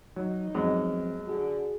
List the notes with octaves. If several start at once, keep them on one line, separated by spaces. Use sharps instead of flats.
F#3 D#4
F#2 F3 G#3 B3 C4 D#5
D3 F#4 G#4